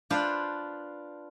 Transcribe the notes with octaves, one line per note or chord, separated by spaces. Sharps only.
D4 F4 B4 C5 D5